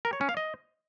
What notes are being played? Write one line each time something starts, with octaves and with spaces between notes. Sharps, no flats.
A#4
C#5
C#4
F5
D#5